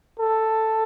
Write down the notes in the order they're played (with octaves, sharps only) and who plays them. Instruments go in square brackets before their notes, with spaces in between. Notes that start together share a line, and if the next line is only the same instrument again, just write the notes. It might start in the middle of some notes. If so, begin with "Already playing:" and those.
[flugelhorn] A4